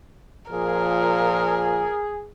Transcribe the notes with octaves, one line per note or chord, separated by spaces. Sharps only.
A#2 F3 G#4 A#4